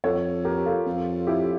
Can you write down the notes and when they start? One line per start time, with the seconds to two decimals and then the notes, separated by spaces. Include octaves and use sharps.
0.04 F2 A4 C#5
0.45 G4 A#4
0.66 F4 A4
0.86 F2
1.27 E4 G4